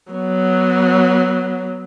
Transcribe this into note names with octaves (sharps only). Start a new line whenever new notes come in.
F#3 B3